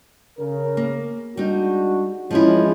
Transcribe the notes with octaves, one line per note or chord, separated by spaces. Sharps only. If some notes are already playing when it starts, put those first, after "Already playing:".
C#3 A#4
A#3
G3 G#3 D4 D#4 F#4
G#1 E3 F3 G#3 C#4 E4